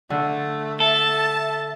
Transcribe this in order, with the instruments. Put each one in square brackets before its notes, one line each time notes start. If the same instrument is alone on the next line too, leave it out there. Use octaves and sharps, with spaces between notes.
[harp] D3 [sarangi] A3
[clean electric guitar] A4 [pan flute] E5 [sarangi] A5